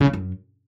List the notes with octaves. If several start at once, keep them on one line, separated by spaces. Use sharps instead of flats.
C#3
F2
F#2